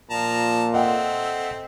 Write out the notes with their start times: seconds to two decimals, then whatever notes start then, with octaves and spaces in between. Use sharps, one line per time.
0.11 A#2 F3 A5 A#5
0.74 A3 C4 D#5 F#5 G5